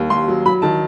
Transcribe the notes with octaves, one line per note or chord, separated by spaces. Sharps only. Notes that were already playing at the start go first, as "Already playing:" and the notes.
Already playing: D#2 G3
D#2 C6
F#3
F#3 B5
D#3 A5